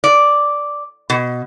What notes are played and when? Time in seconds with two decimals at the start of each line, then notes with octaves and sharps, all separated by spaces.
0.04 D5
1.10 B2